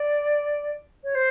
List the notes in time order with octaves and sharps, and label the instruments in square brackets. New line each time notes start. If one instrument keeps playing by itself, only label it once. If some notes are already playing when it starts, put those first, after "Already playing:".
Already playing: [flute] D5
C#5
C5